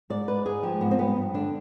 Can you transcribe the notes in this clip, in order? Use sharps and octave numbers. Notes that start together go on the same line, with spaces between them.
G#2 D5
G#3 B4
G#2 G#4
F3 G4
G#2 B3
C4
G3 B3
G2
D3 D4